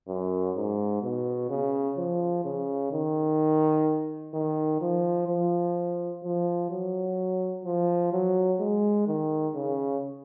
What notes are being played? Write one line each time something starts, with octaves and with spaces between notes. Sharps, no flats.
F#2
G#2
B2
C#3
F3
C#3
D#3
D#3
F3
F3
F3
F#3
F3
F#3
G#3
D#3
C#3